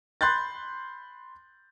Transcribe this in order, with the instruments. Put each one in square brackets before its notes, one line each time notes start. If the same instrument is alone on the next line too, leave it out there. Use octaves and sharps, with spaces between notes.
[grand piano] B5 C6 F#6 G6 A6